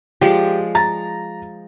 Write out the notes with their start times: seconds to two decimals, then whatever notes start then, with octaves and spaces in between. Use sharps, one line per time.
0.21 F3 G#3 G4 D5
0.75 A#5 A6